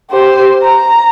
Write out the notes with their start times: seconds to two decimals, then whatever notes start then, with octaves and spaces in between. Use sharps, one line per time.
0.11 G4 C5
0.63 A#5